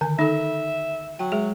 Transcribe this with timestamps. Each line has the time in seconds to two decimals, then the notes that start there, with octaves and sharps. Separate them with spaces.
0.01 D3 D#3 G#5
0.19 D#4 A4 E5
1.19 F#3 G5
1.32 G#3 G#4